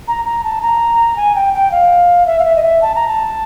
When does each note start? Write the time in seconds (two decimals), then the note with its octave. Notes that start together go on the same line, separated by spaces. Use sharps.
0.08 A#5
0.25 A#5
0.44 A5
0.62 A#5
1.16 G#5
1.35 G5
1.54 G5
1.72 F5
2.26 E5
2.40 F5
2.45 E5
2.56 D#5
2.63 E5
2.82 A5
2.95 A#5
3.08 A5